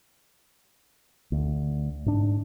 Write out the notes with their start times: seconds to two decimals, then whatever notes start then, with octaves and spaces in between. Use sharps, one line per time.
1.32 D2
2.06 G#2 D4